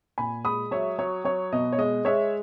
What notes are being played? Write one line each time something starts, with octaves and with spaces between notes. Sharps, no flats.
A#2 G#5 B5
G#3 B5 D#6
F#3 C#5 E5
F#3 C#5
F#3 C#5
B2 D#5
C#5
G#3 D#5
G#3 C#5 E5